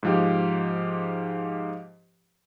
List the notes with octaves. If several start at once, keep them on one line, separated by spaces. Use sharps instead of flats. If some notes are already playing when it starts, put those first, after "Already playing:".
G#2 F3 G4